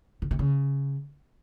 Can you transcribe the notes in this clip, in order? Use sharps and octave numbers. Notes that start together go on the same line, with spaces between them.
C#3
C3
C#3